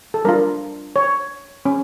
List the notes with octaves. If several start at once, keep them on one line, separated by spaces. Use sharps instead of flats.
A4
G3 D4 F4 A#4
C#5
C#4